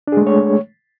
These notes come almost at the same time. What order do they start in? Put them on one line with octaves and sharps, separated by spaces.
D4 G#4 G#3 A3 C#5